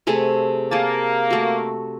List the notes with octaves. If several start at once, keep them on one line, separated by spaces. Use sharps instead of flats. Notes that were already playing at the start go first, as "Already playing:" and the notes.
C3 A3 G#4
A#3 G#4 A5
A3 F#4